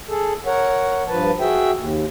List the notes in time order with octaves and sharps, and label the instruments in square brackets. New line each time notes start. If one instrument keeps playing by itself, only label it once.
[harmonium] G#4 A4
A#4 C#5 F#5
G2 F3 B4 A5
F#4 G#4 E5 G5
D#2